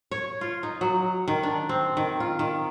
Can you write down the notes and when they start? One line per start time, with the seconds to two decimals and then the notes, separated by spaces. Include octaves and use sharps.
0.11 C#5
0.41 F4
0.63 D#4
0.81 F#3
1.28 D#3
1.43 D4
1.69 C4
1.97 D#3
2.20 F4
2.39 D#3